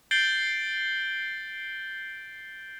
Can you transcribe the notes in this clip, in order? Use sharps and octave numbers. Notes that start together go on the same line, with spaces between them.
G6 A6 C7 D7 F#7 G7